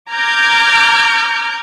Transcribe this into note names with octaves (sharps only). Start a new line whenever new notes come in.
A#5 D6 F6 G6 G#6